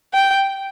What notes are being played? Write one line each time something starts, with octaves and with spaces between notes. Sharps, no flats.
G5